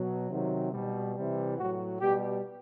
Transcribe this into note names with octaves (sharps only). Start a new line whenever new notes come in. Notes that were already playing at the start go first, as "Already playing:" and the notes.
Already playing: B2 F#3
C3 D#3 F#3
B2 G3
C3 E3 G3
A2 F#3 F#4
B2 G3 G4